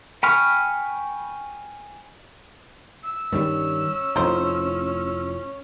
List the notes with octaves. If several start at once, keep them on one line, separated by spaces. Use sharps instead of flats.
G5 G#5 B5 C#6 F6
E6
G2 D#3 G3 C#4
F1 A2 F3 D#4 C5